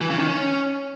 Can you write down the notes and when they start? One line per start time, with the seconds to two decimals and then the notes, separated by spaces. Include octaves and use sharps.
0.01 E3
0.10 C#3
0.19 D#3
0.28 C#4